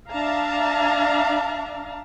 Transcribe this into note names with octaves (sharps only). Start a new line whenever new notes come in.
D4 E5 F5 A5 A#5